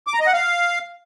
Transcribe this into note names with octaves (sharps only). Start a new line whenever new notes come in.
D6
A#5
D#5
F#5
F5